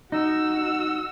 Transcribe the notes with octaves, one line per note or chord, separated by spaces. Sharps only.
D#4 F#4 E6